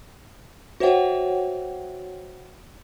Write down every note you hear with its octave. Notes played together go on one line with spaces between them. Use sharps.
F#4 C5 C#5 E5 F#5 G5